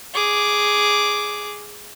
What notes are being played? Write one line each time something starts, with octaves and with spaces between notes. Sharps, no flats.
G#4 D6